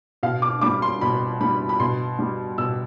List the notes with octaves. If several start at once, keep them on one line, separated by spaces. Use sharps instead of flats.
B2 F5
D6
G3 D6
C6
B2 B5
G3 B5
B5
B2 C6
G3
B2 E6